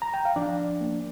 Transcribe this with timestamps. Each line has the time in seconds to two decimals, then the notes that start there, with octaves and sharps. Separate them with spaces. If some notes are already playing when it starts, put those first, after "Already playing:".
0.02 A#5
0.14 G5
0.25 F5
0.36 F3 D4 D5
0.81 A#3